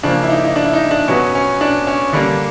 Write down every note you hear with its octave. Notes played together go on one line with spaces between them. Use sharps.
C#3 F3 A#3 D4
E4
D#4
D#4
D4
E4
D#4
D4
B2 F#3 B3 C#4
C#4
D4
C#4
D3 G3 A#3 D4